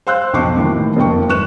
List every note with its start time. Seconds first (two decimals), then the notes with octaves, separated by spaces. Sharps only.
0.07 C5 F5 C6 E6 F#6 G6
0.33 B1 F2 C#6 D6 C7
0.57 D#2 A2 D#3 E3
0.96 F#1 F2 A#3 G5 C#6
1.29 G#1 B4 C#6 F#6 E7